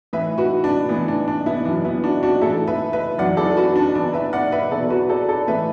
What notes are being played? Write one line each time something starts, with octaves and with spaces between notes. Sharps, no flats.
A2 E3 B4 E5
F#4 B4
D4
A2 E3 B3
D4
D4
B3 E4
F#2 E3 D4
B3 E4
D4 F#4
D4 F#4
A2 E3 E4 A4
B4 E5
B4 E5
F#2 E3 D5 F#5
A4 D5
F#4 B4
D4
E2 E3 D4
B4 E5
D5 F#5
B4 E5
E2 B2 A4 D5
F#4 B4
A4 D5
A4 D5
A2 E3 B4 E5